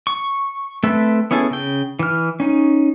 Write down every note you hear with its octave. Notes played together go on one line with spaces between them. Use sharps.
C#6
A3 C4 A4 B4 E5
B3 C#4 E4 G#4 A4
C#3 G5
E3 F6
C#4 D#4